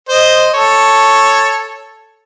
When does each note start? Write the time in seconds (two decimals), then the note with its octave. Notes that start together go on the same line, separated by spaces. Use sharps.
0.09 C5 D#5
0.54 A4 C#5